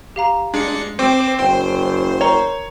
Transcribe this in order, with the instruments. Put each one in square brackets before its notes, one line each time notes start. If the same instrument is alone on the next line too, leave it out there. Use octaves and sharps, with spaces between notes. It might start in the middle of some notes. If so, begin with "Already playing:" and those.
[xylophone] G4 F5 A#5
[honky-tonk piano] G#3 [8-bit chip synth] D4 C#7
[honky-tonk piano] C4 [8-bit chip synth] C5 D6
[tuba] F#1 [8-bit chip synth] C5 [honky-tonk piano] G5
[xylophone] A#4 A#5 [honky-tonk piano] C#5